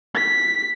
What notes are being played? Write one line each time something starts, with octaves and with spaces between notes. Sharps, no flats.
B6